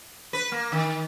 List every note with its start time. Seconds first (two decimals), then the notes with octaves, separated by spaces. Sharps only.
0.33 B4
0.52 A#3
0.72 D#3